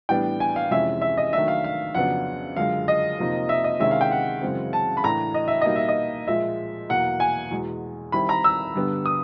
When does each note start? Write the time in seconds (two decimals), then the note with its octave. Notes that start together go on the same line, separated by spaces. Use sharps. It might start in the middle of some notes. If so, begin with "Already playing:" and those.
0.09 A2 E3 G3 B3 D4 G5
0.40 G#5
0.56 F5
0.71 F2 C3 E3 G#3 C#4 E5
1.02 E5
1.17 D#5
1.33 D#3 F#3 A3 D4 E5
1.48 F5
1.64 F5
1.94 F2 C#3 F#3 B3 D4 F#5
2.56 F#2 D3 F3 G#3 F5
2.88 D#5
3.18 F2 C3 F3 A#3 D#4
3.49 E5
3.64 D#5
3.80 C3 D#3 G#3 C#4 E4 E5
3.91 F5
4.01 G5
4.11 F#5
4.41 F#2 C#3 E3 G#3 C4
4.73 A5
4.97 B5
5.04 A2 E3 A3 D4 A#5
5.34 D#5
5.48 E5
5.61 B2 G3 A#3 D#4 D#5
5.76 E5
5.88 D#5
6.27 A#2 F3 G#3 E5
6.89 E2 B2 F#3 A#3 F#5
7.20 G#5
7.51 E2 B2 G#3
8.12 D#3 G3 C4 E4 B5
8.29 A#5
8.44 E6
8.74 G2 D3 G3 B3
9.06 D#6